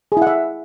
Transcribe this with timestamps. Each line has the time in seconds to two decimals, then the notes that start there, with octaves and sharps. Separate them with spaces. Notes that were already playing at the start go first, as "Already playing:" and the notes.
0.12 G#4
0.17 E4
0.22 F#5
0.27 E5